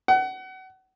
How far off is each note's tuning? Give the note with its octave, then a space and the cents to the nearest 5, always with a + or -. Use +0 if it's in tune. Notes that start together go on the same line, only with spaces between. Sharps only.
F#5 +30